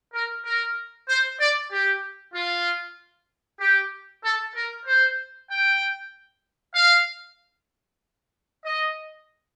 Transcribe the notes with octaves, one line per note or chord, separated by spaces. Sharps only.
A#4
A#4
C5
D5
G4
F4
G4
A4
A#4
C5
G5
F5
D#5